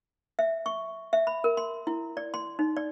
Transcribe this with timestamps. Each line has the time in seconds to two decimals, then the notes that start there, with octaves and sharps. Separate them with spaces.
0.39 E5
0.66 C#6
1.13 E5
1.27 B5
1.44 A#4
1.57 C6
1.87 E4
2.17 D5
2.34 C6
2.59 D#4
2.77 D5